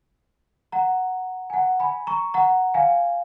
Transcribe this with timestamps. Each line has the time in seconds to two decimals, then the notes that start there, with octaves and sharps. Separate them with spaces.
0.72 F#5 A#5
1.50 G#5
1.53 F#5 A#5
1.80 G#5 B5
2.07 A#5 C#6
2.34 F#5 A#5
2.74 F5 G#5